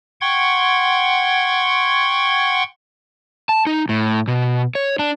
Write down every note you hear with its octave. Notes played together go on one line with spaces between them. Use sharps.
F#5 G5 C6 C#6 G#6
A5
D#4
A2
B2
C#5
D4